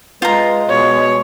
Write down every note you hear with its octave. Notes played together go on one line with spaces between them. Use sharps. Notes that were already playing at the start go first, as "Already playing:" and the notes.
G#3 F4 B4 A#5
B2 C#5